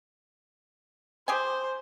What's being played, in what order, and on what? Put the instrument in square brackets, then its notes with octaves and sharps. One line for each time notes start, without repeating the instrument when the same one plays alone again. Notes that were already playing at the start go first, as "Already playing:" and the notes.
[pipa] G4 G#4 G#5 [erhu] C5